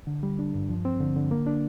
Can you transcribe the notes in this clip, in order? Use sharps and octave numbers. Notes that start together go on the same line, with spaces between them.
D3
G3
D4
G2
F3
C4
D3
D3
A#3
D4